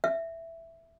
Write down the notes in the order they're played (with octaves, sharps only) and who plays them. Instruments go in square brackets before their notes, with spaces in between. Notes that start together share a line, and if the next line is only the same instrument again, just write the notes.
[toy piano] E5